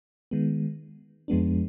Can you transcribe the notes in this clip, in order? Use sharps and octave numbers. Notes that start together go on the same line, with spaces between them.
D#3 G#3 B3
F2 F3 G#3 B3 D4